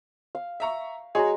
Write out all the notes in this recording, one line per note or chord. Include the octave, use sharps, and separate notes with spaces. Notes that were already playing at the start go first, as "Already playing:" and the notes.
F5
E5 A#5 C#6
G#3 F#4 G#4 C#5 A#5